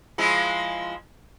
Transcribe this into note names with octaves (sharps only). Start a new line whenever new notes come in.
F3 G#3 E4